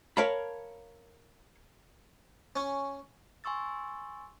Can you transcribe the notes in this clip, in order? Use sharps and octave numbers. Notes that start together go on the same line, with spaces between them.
A#4 C#5 F5 A5 B5
C#4
G#5 C6 C#6 E6 A6